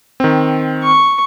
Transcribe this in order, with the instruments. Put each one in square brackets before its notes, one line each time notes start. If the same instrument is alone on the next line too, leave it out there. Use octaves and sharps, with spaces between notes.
[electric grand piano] D#3 C4
[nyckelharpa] C#6